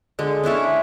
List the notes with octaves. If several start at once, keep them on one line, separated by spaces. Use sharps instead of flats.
D3 G#3
C#4 D4 E4 C#5